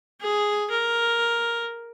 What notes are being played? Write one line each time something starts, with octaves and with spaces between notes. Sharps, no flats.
G#4
A#4